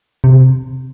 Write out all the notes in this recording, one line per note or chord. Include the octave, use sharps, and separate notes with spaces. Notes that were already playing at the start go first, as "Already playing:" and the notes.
C3